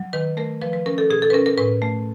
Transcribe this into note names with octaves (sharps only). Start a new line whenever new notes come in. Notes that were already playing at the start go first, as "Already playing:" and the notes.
Already playing: F#3
D#3 B4
A3 A#4
F3 B4
B4
C#4 A#4
A4
B2 G#4
A4
B4
C#4 A#4
A#4
A2 B4
A3